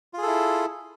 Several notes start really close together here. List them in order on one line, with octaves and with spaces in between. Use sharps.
F4 G#4 A4 E4